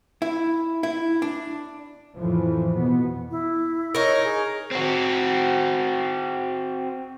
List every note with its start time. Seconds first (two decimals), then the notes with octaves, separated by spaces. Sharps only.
0.22 E4
0.83 E4
1.22 D4
2.17 F2 A2 E3 F3
2.77 B2 B3
3.29 E4
3.94 D#4 A#4 C#5 D#5 C#6
4.23 G#4
4.71 C4 F#4